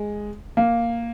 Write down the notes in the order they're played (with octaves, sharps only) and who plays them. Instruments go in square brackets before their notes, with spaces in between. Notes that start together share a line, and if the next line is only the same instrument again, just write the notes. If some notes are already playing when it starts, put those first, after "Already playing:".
Already playing: [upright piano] G#3
A#3